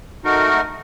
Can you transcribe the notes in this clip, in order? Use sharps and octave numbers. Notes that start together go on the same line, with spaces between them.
A3 D#4 F#4 A#4